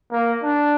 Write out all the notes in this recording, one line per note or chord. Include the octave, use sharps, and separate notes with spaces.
A#3
D4